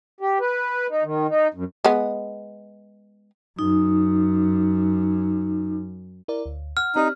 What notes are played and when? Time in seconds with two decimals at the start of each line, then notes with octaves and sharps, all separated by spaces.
0.21 G4
0.40 B4
0.90 D#4
1.03 D#3
1.29 D#4
1.54 F#2
1.84 G#3 B3
3.59 F#2 D#4
6.28 E4 A#4 D5
6.46 D2
6.77 F#5 F6
6.96 C4 D#4 G4 D5